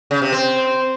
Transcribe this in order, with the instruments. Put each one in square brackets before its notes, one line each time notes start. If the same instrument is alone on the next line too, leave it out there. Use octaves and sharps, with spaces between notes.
[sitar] C#3
C3
C4